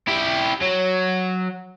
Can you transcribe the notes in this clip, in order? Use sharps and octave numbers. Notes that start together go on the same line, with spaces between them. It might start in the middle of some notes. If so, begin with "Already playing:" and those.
E4 G4
F#3